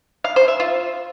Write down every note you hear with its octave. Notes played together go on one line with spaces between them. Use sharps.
F5
C5
E5
F4